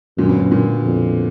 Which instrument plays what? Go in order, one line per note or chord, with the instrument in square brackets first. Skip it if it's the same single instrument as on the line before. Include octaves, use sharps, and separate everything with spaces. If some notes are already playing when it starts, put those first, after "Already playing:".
[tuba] F#2 [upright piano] A#2 D3
[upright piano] B2
B2
A#2 D3
[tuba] F2